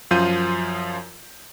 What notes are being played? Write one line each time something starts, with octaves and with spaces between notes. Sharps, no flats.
F#2 F3 F4 C6 G6 D#7